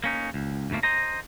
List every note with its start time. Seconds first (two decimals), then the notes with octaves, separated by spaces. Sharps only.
0.04 A#3 C#4 D#4
0.34 C#2
0.70 D2 G#2 B2 A3 A#3
0.83 C5 D#5 A#5